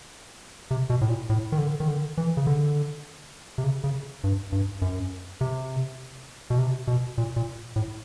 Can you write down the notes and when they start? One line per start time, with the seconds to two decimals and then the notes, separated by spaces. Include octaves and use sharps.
0.71 C3
0.90 B2
1.01 A2
1.09 A#2
1.30 A2
1.52 D#3
1.58 D3
1.80 D#3
1.88 D3
2.18 E3
2.37 C#3
2.47 D3
3.58 C3
3.64 C#3
3.84 C#3
4.24 G2
4.52 G2
4.82 F#2
5.41 C3
6.50 B2
6.58 C3
6.87 B2
7.18 A#2
7.36 A#2
7.76 A2